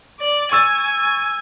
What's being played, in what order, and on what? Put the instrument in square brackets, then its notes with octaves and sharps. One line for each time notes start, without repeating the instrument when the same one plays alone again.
[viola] D5
[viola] G#5 [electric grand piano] C#6 E6 A6